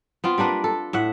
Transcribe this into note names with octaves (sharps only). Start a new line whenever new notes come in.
B3 C4 F4
G3 A#3 D4 B4
A4
A2 E5 F#5